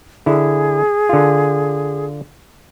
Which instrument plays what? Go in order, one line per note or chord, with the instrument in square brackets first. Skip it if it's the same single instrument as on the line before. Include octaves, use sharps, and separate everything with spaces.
[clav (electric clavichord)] D3 E4 [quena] G#4
[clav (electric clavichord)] D3 F4